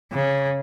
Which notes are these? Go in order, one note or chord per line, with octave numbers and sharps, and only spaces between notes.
C#3